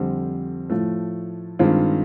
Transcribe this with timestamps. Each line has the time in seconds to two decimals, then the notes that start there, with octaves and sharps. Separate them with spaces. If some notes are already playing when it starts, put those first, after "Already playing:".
Already playing: F2 D3 G3 C4
0.70 A2 F3 A3
1.59 G2 D#3 G#3 C4 F4